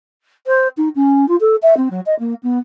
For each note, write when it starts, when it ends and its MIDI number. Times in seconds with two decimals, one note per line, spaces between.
0.47 0.68 72
0.77 0.89 63
0.95 1.28 61
1.28 1.36 65
1.40 1.56 69
1.62 1.74 76
1.77 1.88 60
1.91 2.00 54
2.06 2.15 75
2.19 2.34 58
2.43 2.59 59